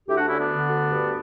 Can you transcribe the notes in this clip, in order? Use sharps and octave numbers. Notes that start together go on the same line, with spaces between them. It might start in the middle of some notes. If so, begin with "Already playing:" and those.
D2 E4 G4
D4 F#4
D3 C#4 E4
B3 D4
D3
D2
G2